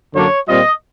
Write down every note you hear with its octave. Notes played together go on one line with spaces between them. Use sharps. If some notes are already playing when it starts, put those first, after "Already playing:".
F#2 D3 F#3 A#3 D4 C#5
A#2 G3 C4 F4 D#5